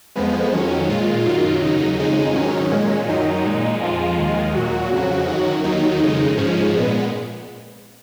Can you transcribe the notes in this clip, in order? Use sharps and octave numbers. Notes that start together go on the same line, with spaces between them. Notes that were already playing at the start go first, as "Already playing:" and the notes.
F2 F3 G#3 B3
F2 D#3 F#3 C#4
A#2 G#3 F4
F#2 D#3 F#3
D#2 C#3 F#3 D#4
F2 C#3 G#3 D#4
G#2 D#3 F#3 C#4
A#2 G#3
F#2 D#3 F#3 D#4
A#2 G#3
F2 F3 G#3 F4
D#2 D#3 G#3
A#2 F#3 F#4
F2 C#3 F#3
F#2 D#3 F#3
D#2 D#3 F#3 D#4
F2 C#3 G#3
G#2 F3 G#3 C#4
A#2 G#3 B3